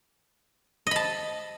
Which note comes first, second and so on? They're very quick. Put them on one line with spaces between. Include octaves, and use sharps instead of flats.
D#5 B5 A5